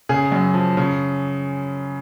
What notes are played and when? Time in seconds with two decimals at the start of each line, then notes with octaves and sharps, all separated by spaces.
0.09 C#3 G#4
0.32 F#2
0.54 F3
0.77 C#3